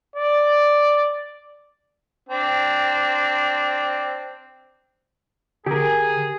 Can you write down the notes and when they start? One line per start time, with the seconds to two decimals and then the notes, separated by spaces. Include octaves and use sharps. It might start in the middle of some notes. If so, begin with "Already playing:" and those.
0.16 D5
2.29 C4 D4
5.66 D3 G4 G#4 A#4